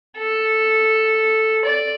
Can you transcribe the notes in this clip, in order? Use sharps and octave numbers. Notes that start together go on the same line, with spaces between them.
A4
D5